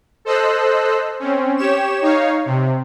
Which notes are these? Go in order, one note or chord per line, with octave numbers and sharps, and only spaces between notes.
A4 C5 D#5 E6 F#6
C4 C#4
G4 C#5 E7
D#4 C#5 F5
C3